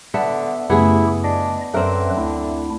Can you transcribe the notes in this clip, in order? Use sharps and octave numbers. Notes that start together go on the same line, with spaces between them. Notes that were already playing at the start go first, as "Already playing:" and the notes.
D3 B3 A4 E5
F#2 C#3 A3 B3 E4 G4 G#4
D4 D#5
F#2 D3 F#3 C4 A#4 B4 E5
D2 D4 E4